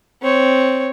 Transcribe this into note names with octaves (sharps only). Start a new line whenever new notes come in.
C4 C#5